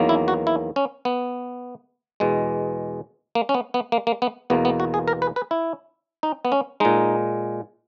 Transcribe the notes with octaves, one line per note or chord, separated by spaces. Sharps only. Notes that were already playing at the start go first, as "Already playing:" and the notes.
Already playing: E2 D#3 F#3 A#3
E4
F#4
E4
C#4
B3
E2 B2 G#3
A#3
C#4
B3
B3
A#3
A#3
B3
E2 B2 A#3 B3
B3
F#4
G#4
A#4
B4
B4
E4
D#4
B3
C#4
A#2 G#3 D#4